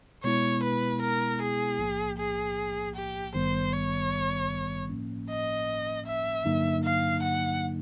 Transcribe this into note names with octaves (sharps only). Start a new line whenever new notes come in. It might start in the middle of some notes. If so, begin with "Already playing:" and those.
B2 G#3 B3 E4 C#5
B4
A#4
G#4
B1 A2 F3 A#3
G#4
G4
G#1 G2 D#3 G3 B3 C5
C#5
A2 F3 A#3 C#4
D#5
E5
G2 D3 F#3 A#3 D#4
F5
F#5